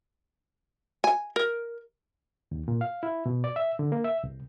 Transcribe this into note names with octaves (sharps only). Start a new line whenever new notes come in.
G#5
A#4
D#2
A#2
F5
E4
B2
D5
E5
D3
A#3
E5
C2